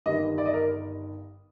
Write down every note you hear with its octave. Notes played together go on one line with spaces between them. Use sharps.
G1 G2 D#3 D#5
D5
D#5
A#4